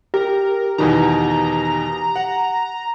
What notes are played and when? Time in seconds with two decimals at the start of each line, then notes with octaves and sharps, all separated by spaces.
0.14 G4 A#4
0.78 E2 B2 D#3 A#5
2.16 F#5